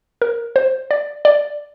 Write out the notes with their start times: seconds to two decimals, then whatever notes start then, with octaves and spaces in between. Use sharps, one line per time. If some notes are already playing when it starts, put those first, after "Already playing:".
0.22 A#4
0.56 C5
0.91 D5
1.25 D5